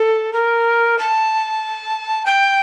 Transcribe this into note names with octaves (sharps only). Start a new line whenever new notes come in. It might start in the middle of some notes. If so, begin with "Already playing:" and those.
Already playing: A4
A#4
A5
G5